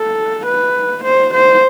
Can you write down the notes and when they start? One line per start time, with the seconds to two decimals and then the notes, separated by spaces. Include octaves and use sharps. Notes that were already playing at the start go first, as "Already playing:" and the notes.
Already playing: A4
0.46 B4
1.04 C5
1.34 C5